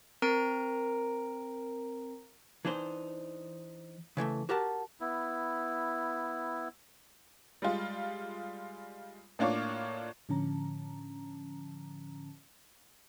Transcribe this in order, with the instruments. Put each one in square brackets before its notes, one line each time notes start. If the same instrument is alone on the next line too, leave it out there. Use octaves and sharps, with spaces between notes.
[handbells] C4 A#4 A#5 D7
[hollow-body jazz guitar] E3 D4 D#4 C5
C#3 E3 G#3 A3
F#4 G4 A#4 F#5 A5
[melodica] B3 E4
[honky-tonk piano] G3 G#3 F4
A2 A#3 D4 F4 C#5 D6
[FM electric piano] A2 D3 F3 C#4 A5 A#5